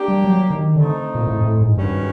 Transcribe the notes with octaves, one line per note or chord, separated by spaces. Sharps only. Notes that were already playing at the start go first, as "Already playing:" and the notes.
Already playing: A#3 D4 G4
G3
F#3
D#3
D3 A3 C4 D#4
A#2
A2
A2
G#2
G2 D#3 G#3 C#4 F#4 B4